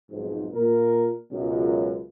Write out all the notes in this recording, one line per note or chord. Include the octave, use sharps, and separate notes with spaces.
B1 F2 G#2
A#2 A#4
C#2 F#2 B2